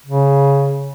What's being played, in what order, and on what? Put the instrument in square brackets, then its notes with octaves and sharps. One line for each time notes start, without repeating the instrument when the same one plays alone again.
[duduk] C#3